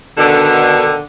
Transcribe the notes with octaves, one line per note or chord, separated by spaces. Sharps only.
B2 D3 D#3